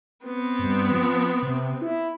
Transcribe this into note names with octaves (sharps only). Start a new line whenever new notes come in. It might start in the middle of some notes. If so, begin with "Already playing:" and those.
B3 C4
G2
F3
C3
E4